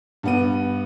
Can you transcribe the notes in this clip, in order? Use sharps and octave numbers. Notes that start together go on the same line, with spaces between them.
G2 B3 D#7